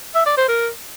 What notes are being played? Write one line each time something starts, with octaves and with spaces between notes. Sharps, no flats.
E5
D5
C5
A#4